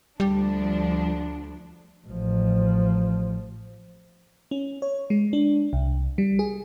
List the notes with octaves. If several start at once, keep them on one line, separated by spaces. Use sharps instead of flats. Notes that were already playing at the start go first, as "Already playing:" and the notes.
D2 F3 G3 D4
A1 F3
C#4
C#5
G#3
D4
C2
G3
G#4